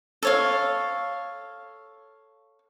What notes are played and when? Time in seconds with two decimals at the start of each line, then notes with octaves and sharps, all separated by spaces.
0.23 A4 C#5 F5